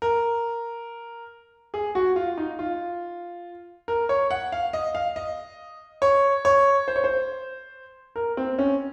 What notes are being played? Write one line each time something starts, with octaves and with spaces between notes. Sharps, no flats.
A#4
G#4
F#4
F4
D#4
F4
A#4
C#5
F#5
F5
D#5
F5
D#5
C#5
C#5
C5
C#5
C5
A#4
C4
C#4